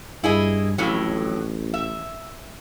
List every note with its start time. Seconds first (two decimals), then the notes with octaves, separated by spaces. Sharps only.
0.24 G2 E4 G#4 D#5
0.78 A1 F2 A2 F#3
1.74 E5